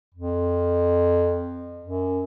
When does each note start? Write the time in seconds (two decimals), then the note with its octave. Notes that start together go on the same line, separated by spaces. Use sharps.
0.14 F2
1.84 F#2